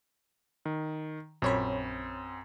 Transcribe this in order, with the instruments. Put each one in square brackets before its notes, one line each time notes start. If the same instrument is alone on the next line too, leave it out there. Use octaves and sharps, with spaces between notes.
[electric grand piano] D#3
[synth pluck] A#1 C#5 B5 [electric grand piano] F#2 C4